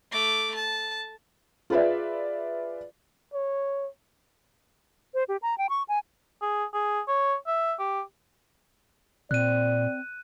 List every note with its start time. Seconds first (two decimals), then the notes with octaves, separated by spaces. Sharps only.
0.12 A3 D6
0.55 A5
1.70 F4 G#4 B4 D5 E5
3.33 C#5
5.14 C5
5.28 G4
5.42 A#5
5.58 G5
5.69 C#6
5.88 G#5
6.42 G#4
6.74 G#4
7.08 C#5
7.47 E5
7.79 G4
9.31 A#2 C4 D5 F#6 D#7